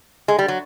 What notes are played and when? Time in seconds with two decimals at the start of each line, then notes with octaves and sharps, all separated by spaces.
0.28 G#3
0.39 G3
0.48 F#3